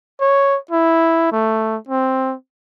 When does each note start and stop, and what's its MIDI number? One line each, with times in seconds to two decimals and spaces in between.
0.20 0.57 73
0.71 1.30 64
1.32 1.77 57
1.89 2.34 60